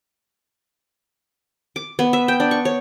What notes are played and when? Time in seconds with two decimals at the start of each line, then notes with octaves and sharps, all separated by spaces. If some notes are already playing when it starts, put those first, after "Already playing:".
1.76 D6
1.99 B3
2.13 E5
2.28 G5
2.40 D4
2.51 C#6
2.65 C#5